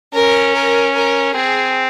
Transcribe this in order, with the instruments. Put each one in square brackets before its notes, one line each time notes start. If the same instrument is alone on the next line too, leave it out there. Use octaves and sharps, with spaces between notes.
[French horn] C#4 [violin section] A#4
[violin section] A#4
A#4
[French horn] C4 [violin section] G#4